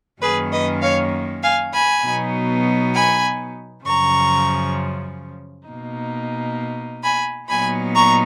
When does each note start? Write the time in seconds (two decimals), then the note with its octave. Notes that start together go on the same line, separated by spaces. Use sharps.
0.21 F#2 D#3 A#3 C#4 G#4 B4
0.52 B4 D#5
0.82 C#5 F5
1.42 F5 G#5
1.73 G#5 B5
2.04 B2 F#3 B3 D#4
2.94 G#5 B5
3.85 F#2 C#3 F3 A#5 C#6
5.68 B2 A#3 D#4
7.03 G#5 B5
7.48 A#2 F#3 B3 D#4 G#5 B5
7.95 A#5 C#6